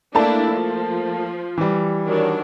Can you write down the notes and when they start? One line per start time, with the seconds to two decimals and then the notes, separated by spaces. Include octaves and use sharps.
0.15 A3 A#3 D4 E4 A5
0.53 F3
1.58 E3 G3
2.05 D#3 F#3 D4